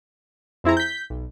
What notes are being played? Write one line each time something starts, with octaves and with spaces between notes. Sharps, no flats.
F2 C4 E4 G#4 A#5
G6 B6
B1